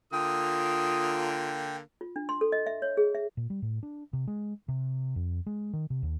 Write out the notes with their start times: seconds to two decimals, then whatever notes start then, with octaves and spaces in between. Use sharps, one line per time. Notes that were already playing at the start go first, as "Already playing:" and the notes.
0.13 D3 A#3 F4 G5 D#6
2.01 F4
2.16 D4
2.29 C6
2.41 A4
2.52 D#5
2.67 E5
2.82 C#5
2.97 G#4
3.15 E5
3.37 A#2
3.50 G3
3.62 A2
3.83 D4
4.13 C3
4.27 G#3
4.68 C3
5.16 F2
5.46 G#3
5.73 D#3
5.90 C3
6.03 D#2